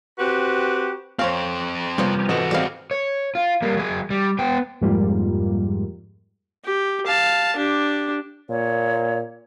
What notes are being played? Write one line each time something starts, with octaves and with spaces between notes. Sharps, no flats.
C4 F#4 G4 B4
F2 C4 C5 C#5 F5
C3 F3 G3 A#3 B3 C#4
G#2 E3 F#4 A4 B4 D#5
G3 G#3 C4 D5 F5
C#5
F4
G3 A#3
F#3 G#4
G3
B3 G5
F2 G#2 G3 A#3 F4
G4
F5 A5
D4 G4
A#2 C#5